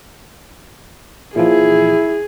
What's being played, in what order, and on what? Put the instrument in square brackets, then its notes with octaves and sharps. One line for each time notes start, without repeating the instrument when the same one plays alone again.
[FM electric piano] A#2 E3 F3 [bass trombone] E4 [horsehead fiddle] G#4